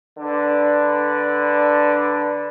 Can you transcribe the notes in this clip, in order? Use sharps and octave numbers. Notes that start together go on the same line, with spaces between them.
D3 D4 B4